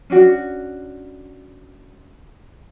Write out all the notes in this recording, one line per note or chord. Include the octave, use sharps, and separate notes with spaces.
C#4 D4 F#4